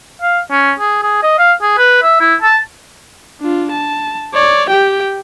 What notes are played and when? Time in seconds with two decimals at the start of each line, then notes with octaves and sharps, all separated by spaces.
0.22 F5
0.51 C#4
0.80 G#4
1.03 G#4
1.23 D#5
1.39 F5
1.62 G#4
1.78 B4
2.03 E5
2.21 E4
2.42 A5
3.41 D4 F4
3.72 A5
4.34 C#5 D5
4.70 G4 G5